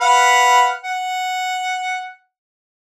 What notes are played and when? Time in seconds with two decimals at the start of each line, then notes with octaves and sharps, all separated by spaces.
0.01 B4 F5 F#5
0.83 F#5